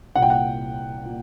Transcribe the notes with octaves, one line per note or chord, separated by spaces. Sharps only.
C2 A#2 F#5 G5
F#5
A#2